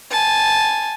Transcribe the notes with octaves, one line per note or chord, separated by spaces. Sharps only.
G#5 A5